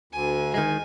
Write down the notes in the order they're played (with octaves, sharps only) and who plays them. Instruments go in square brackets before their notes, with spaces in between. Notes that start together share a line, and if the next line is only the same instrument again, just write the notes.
[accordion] D2 [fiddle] G#5
[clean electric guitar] D#3 G#3 [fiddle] G#5